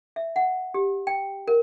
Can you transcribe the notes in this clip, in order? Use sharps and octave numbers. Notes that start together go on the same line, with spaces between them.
E5
F#5
G4
G5
A#4